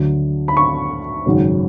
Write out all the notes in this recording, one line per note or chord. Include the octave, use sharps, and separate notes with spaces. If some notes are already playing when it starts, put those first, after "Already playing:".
Already playing: D2 D3 F#3 A3
B5
C#6
G#1 F#2 C#3 F#3